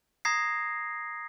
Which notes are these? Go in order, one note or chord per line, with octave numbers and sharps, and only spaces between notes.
A#5 D#6 G#6 A#6 C7